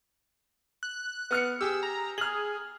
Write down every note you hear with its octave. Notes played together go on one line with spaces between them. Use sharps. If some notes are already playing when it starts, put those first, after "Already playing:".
F#6
B3 F6 C#7
G4 G#4 E6
A#5
G#4 F6 F#7